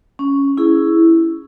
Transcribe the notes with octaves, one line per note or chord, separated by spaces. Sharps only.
C#4
E4 G#4